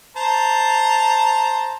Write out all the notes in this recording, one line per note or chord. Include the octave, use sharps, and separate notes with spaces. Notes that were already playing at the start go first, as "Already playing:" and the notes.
C5 A5 A#5